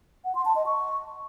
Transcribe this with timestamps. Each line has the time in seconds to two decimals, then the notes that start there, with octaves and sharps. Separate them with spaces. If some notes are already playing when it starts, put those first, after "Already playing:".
0.25 F#5
0.35 C6
0.45 A5
0.56 D#5
0.66 C#6